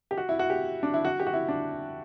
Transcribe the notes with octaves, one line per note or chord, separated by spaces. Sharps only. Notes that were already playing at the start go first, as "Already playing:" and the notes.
G4
F#4
E4
F#4
G4
D4
E4
F#4
G4
F#4
E4
D4